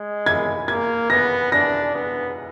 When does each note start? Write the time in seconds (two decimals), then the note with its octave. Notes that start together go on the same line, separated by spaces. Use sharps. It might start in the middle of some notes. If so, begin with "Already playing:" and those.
Already playing: G#3
0.26 G#6
0.68 A#3 G#6
1.10 B3 A#6
1.52 D4 A#6
1.94 B3